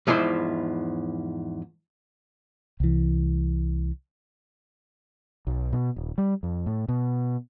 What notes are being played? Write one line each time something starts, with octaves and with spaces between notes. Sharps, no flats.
E2 G#2 F3 E4 C5
C2 E3
B1
B2
D#1
G3
F2
A2
B2